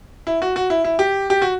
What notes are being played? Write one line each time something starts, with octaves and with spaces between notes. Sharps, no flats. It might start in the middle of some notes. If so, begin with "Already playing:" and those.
E4
F#4
F#4
E4
E4
G4
G4
F#4